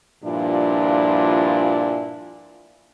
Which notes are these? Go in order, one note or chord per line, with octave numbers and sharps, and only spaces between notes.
G2 A#2 F3 D4 E4 F4